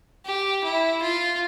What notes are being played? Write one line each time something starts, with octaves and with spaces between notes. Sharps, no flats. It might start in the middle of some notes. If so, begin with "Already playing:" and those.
G4
E4
F4